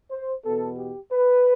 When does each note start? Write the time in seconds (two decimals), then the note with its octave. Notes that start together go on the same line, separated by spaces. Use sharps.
0.10 C5
0.44 E2 B2 B3 A4
0.77 G4
1.11 B4